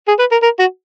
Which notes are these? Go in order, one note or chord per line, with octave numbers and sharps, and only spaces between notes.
G#4
B4
A#4
A#4
F#4